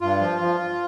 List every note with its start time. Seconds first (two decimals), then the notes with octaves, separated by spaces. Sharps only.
0.01 G2 F4
0.21 F3
0.40 F3